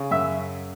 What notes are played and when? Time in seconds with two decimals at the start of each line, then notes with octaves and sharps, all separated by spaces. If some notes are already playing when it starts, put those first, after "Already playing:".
Already playing: C#3
0.11 F#2 E5